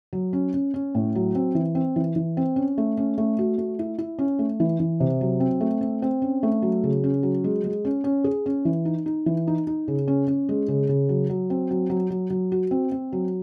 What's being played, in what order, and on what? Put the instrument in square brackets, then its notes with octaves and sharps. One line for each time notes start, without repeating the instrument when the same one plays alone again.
[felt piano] F#3
C#4
C#4
C#4
A2
F#3
C4
E3
C4
E3
E3
C4
C#4
A3
C#4
A3
F#4
A3
E4
E4
C#4
A3
E3
E3
C3
F#3
C4
A3
C4
C4
C#4
A3
F#3
C#3
C#4
F#3
G#3
G#3
C#4
C#4
G#4
C#4
E3
D#4
D#4
E3
D#4
D#4
C#3
C#4
C#4
G#3
C#3
C#3
F#3
F#3
C4
F#3
F#3
F#3
F#3
F#4
C4
C4
F#3